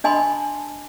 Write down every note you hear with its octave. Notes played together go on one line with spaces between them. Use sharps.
D4 D#5 G#5 A5 B5 C6